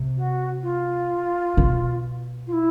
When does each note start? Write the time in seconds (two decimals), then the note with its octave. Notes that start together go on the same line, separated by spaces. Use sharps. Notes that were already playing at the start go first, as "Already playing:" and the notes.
Already playing: C3
0.16 F#4
0.62 F4
1.57 B2
2.46 F4
2.52 E4